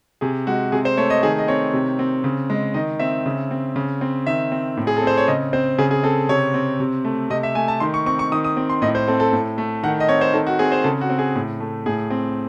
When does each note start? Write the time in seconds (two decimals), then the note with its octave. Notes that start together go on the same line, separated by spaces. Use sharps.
0.21 C3 G#4
0.47 G#3 F#4
0.72 C3 G#4
0.85 C5
0.97 A3 C#5
1.10 D#5
1.23 D#3 G#4
1.39 D#5
1.48 C4 C#5
1.73 C3
1.99 C4
2.24 C#3
2.50 G#3
2.74 D#3 D#5
2.99 C4 E5
3.26 C#3
3.51 C4
3.76 C#3
4.01 C4
4.26 D#3 E5
4.52 C4
4.77 A2
4.87 G#4
4.97 A4
5.02 C4 C5
5.17 C#5
5.27 C#3 D#5
5.53 C4 C5
5.78 C#3 G#4
5.91 G#4
6.03 C4 A4
6.29 C3 C#5
6.54 C4
6.80 C3
7.05 A3
7.30 C3 D#5
7.43 E5
7.55 A3 G#5
7.68 A5
7.80 D#3 C6
7.94 C#6
8.06 C4 C#6
8.19 C#6
8.32 D#3 D#6
8.44 D#6
8.57 C4
8.70 C6
8.82 A2 D#5
8.95 C5
9.08 C4 A4
9.20 A4
9.33 A2
9.58 A3
9.83 D#3 F#5
10.00 D#5
10.09 C4 C#5
10.21 C5
10.34 D#3 A4
10.47 F#4
10.59 C4 G#4
10.72 C5
10.84 C#3 A4
11.01 F#4
11.10 C4
11.19 G#4
11.35 A2
11.60 A3
11.86 A2 G#4
12.10 C4